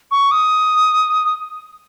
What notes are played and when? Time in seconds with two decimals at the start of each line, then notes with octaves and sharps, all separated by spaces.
0.11 C#6
0.31 D#6